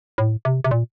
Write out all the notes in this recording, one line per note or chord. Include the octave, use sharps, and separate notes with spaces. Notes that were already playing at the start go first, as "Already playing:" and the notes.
A2
C3
C3
A#2